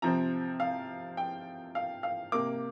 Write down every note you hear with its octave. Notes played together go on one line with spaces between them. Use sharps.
C3 F3 C4 A#5
F5
G5
F5
F5
C3 A#3 D6